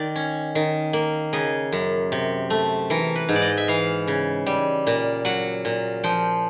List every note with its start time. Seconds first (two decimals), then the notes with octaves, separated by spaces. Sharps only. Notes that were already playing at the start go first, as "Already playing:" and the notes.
Already playing: D#3 D5
0.16 C#4
0.55 D#3
0.93 A#3
1.33 C#3 D#5
1.72 F#2
2.12 C3
2.50 A3
2.90 E3 A#4
3.16 B4
3.29 G#2
3.36 D5
3.42 D#5
3.57 E5
3.68 E3 F5
4.07 C#3
4.46 G3
4.87 A#2
5.25 F#3 F#5
5.65 A#2
6.04 F3 G5